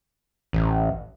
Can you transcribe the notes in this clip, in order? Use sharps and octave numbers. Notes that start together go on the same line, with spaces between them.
A1